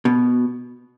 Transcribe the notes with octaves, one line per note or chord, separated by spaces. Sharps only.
B2